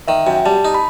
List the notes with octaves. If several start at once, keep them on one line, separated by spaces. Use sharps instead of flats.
D#3 E5
F#2 G5
G3 A5
D#4
B5